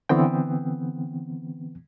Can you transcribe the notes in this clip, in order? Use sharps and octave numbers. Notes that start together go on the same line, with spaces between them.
D3 E3 B3 C4 G5